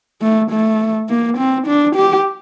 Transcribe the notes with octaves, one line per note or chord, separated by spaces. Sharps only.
A3
A3
A#3
C4
D4
G4